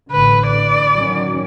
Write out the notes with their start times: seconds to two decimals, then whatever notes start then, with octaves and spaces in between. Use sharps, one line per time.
0.11 A1 D3 B4
0.47 D5
0.96 D#3 F#3 C#4